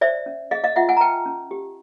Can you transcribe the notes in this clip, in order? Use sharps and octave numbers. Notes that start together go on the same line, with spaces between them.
C5 D5 E5
C#4
G#4 D#5 F5
D#5 F5
F4 E5 F#5
F#5 G#5
A#5
B4 G5 A5
C#4
G4